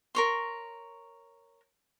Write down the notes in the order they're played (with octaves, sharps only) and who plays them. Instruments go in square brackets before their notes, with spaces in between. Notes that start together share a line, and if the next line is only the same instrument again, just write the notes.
[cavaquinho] A#4 C#5 C6